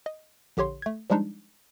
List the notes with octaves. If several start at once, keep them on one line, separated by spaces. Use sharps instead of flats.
D#5
A#1 D3 G4 C#5 C6
A3 G#6
F3 G3 G#3 D4 D#4